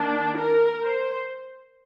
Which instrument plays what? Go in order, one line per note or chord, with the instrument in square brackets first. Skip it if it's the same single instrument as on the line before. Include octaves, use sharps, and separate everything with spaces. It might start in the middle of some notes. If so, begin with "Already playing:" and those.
Already playing: [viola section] D#3 A#3 D4
A#4
C5